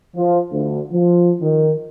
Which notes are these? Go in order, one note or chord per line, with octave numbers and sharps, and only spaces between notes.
F3
D2
F3
D#3